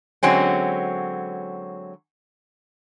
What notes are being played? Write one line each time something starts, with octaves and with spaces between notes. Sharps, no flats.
D3 F#3 G#3 C4 C#4